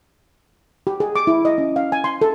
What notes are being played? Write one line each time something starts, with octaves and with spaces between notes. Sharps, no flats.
G4
G#4
D6
E4
D#5
C#4
F5
G#5
C6
A4